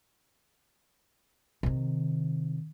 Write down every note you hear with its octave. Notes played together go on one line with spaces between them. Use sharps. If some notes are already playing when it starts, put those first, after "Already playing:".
C3 D#3